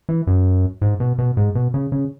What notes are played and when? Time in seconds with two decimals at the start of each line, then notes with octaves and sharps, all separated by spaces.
0.09 E3
0.27 F#2
0.81 G#2
1.00 B2
1.18 B2
1.37 G#2
1.55 B2
1.74 C#3
1.92 C#3